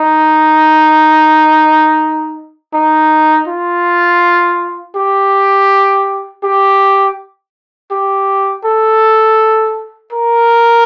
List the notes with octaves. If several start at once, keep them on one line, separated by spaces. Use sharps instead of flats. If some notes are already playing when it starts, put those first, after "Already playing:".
Already playing: D#4
D#4
F4
G4
G4
G4
A4
A#4